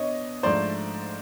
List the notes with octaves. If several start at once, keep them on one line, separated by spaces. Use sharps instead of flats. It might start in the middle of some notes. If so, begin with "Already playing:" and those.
Already playing: B2 B3 D4 C#5 D#5
G#2 F3 A3 D4 C5 D5